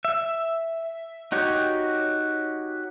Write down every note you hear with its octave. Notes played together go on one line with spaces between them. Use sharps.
E5
D#4 F#4 G4 C#5